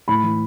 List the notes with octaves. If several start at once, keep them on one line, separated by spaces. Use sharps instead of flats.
A2 B5
E3